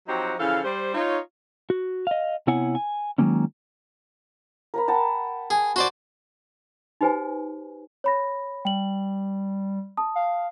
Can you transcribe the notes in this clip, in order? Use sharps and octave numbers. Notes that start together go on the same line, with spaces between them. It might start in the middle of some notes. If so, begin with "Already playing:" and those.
F3 F#3 C4 D#4 F#4 G4
C#3 E3 F3 A4 F5
G3 C5
D#4 F4 C#5
F#4
D#5 F5
C3 B3 E4 C#5 F#5 G#5
G#5
D#3 F3 F#3 G#3 A#3 C#4
A#4 A#5 B5
F#5 G5 A5
G#4
F#4 C5 D5
D#4 F#4 G4 B4 C5 G#5
C#5 B5 A#6
G3 G5 F#7
A5 D#6
F5